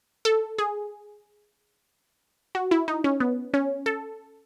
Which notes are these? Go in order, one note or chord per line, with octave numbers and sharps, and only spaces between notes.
A4
G#4
F#4
E4
D#4
C#4
B3
C#4
A4